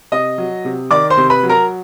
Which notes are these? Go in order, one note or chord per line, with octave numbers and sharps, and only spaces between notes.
C3 D#5 D#6
F#3
C3
D#3 D5 D6
C5 C6
C3
B4 B5
F#3
A#4 A#5